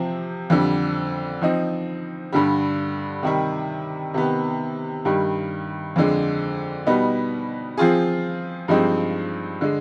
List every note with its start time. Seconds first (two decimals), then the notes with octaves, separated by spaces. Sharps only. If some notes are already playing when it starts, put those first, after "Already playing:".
Already playing: C3 F3 C4
0.50 F2 D3 G3
1.41 F3 C4 D#4
2.32 G2 D3 G3
3.23 C3 D#3 G3
4.14 C3 D#3 B3
5.05 G2 D#3 G3
5.96 F2 D3 G#3
6.87 B2 G3 B3 D#4
7.77 F3 C4 F4 G#4
8.68 G2 F3 G#3 C4 D#4
9.61 D3 G#3